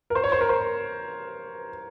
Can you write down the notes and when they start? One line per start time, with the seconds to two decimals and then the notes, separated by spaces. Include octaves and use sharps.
0.10 A#4
0.15 C5
0.24 C#5
0.32 C5
0.41 A#4
0.49 C5